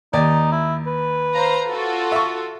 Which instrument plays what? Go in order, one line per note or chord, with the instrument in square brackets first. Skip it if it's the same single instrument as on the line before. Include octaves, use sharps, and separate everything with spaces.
[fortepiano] D#2 D5 [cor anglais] D#4
[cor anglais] E4
B4
[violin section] C5 F5 A#5
F4 F#4 A4
[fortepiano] E5 C#6